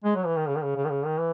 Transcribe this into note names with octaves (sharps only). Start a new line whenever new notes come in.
G#3
F#3
E3
D#3
C#3
D#3
C#3
C#3
D#3
C#3
D#3
E3